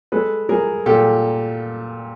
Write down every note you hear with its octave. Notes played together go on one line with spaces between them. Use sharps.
G#3 A4 B4
G#3 G#4 A#4
A#2 G4 A4